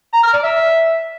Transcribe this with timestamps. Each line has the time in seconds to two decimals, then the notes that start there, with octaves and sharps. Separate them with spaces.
0.13 A#5
0.23 F6
0.33 D5
0.43 E5